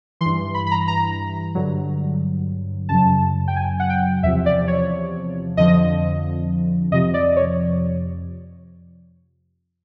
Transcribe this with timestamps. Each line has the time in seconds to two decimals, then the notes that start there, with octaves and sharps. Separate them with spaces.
0.21 E3 C6
0.25 G2
0.54 B5
0.67 B5
0.71 A#5
0.88 A#5
1.55 G2 D3 F#3
2.89 F#2 C#3 F#3 A5
3.48 G5
3.56 G#5
3.80 F#5
3.90 G5
4.23 E2 C3 F3 E5
4.46 D5
4.68 C#5
5.57 F2 D3 F3 D#5
6.91 F2 C3 F3 D#5
7.14 D5
7.36 C#5